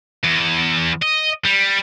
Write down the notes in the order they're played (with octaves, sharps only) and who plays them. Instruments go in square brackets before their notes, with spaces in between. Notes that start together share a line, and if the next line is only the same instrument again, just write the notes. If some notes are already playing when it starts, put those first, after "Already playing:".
[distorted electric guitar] E2
D#5
G3